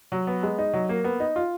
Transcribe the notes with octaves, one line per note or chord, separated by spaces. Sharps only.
F#3
B3
G#3
D#4
F#3
A#3
B3
D#4
F4